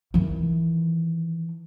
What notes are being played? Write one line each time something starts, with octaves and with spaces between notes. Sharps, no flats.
D#3 E3